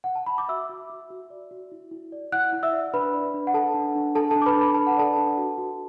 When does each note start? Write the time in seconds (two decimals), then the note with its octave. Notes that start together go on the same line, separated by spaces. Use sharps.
0.04 F#5
0.15 A5
0.27 B5
0.38 D6
0.49 F#4 E5 E6
0.69 F#4
0.90 F#4
1.10 F#4
1.30 D5
1.51 F#4
1.72 E4
1.91 E4
2.12 D5
2.32 E4 F#5 F#6
2.53 E4
2.63 E5 E6
2.73 D5
2.94 D4 B4 B5
3.14 D5
3.34 D4
3.47 F#5
3.54 A4 A5
3.74 D4
3.95 D4
4.15 D4 A4 A5
4.31 D4 A4 A5
4.42 D6
4.46 B4 B5
4.56 D4
4.61 B5
4.74 B4 A5
4.87 F#5
4.97 A4 D5 A5
5.18 D4
5.38 F#4
5.58 F#4